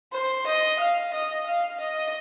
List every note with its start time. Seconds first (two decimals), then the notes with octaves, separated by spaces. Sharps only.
0.12 C5
0.47 D#5
0.79 F5
1.13 D#5
1.46 F5
1.80 D#5